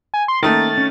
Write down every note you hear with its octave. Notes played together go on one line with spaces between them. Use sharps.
G#5
C6
D#3 A3 A#3 C#4 A#4 A6
C#4